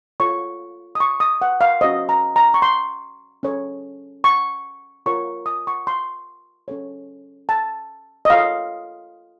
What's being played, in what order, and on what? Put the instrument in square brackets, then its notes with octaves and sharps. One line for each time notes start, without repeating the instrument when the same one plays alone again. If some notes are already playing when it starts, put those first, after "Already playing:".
[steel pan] F4 A4 C#5 C#6
D#6
C#6
D#6
F#5
F5
C#4 F#4 C5 D#5
A#5
A#5
C#6
C6
C#4 A4 C#5
C#6
F4 A#4 C#5 C#6
D#6
C#6
C6
C#4 A4 C#5
A5
D#5
F4 A4 C#5 F5